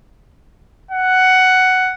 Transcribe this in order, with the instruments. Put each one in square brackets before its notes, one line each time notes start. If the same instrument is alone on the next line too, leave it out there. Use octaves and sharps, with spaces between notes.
[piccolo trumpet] F#5